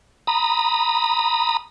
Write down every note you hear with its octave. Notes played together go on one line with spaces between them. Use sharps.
A#5 B5 D#6